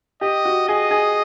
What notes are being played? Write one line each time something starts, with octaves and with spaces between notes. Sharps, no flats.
G4 D#5
F#4
G#4 D#5
G#4